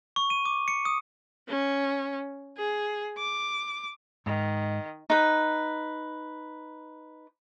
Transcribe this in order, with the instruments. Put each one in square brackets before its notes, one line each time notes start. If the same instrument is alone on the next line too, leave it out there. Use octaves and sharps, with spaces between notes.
[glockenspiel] C#6
D#7
D6
C#7
D#6
[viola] C#4
G#4
D6
[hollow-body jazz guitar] G#2 [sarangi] D#3
[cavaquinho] D#4 B4